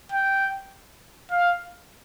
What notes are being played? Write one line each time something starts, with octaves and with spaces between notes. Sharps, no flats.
G5
F5